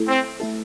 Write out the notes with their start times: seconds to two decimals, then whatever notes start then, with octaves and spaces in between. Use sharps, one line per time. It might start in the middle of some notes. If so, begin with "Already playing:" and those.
Already playing: A3 E4 A4
0.08 C4
0.40 A3 E4 A4